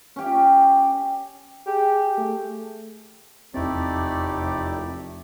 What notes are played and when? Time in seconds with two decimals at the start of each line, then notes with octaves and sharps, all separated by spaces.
0.16 C#4 G4
1.67 G4 G#4
2.18 A3
3.54 F1 E2 A3 C4 D#4 E4 G4 D5